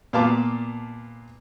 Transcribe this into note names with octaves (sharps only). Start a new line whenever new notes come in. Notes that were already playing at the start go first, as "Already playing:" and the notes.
A#2 B3 F5 A5 D6